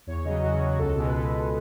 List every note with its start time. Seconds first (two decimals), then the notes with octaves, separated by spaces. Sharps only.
0.07 E2 C#5
0.25 C#3 F#3 D#5
0.43 E2 F#4
0.61 C#3 F#3
0.78 C#2 A4
0.96 B2 G#3
1.05 B4
1.15 C#2 A4
1.33 B2 G#3